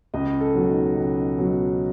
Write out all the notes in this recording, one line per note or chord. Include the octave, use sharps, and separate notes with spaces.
C#2 D#5
A4
B2 F#3
D#4
C#2
B2 F#3